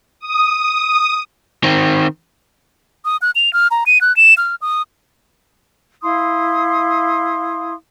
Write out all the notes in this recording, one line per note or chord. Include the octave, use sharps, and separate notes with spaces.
D#6
D#3 C4
D#6
F#6
F7
F6
A#5
D#7
F#6
E7
F6
D#6
E4 F5 C6 D#6